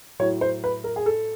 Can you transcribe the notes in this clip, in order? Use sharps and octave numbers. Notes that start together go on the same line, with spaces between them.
A2 F#3 C#5
C5
B4
A#4
G#4
A4